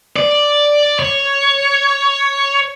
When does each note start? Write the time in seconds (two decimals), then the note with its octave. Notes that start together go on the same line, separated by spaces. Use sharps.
0.16 D5
0.99 C#5